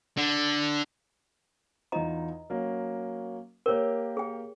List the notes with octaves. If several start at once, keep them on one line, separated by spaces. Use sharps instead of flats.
D3
E2 D#4 F4 D#5 A#5
F#3 A#3 C#4
A#3 G4 A#4 C#5 G7
G#4 G5